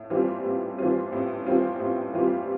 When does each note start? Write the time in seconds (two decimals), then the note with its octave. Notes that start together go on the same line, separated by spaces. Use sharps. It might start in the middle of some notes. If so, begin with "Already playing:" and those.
Already playing: A2
0.10 E3 G3 C4 F4
0.45 A2
0.78 E3 G3 C4 F4
1.12 A2
1.46 E3 G3 C4 F4
1.80 A2
2.14 E3 G3 C4 F4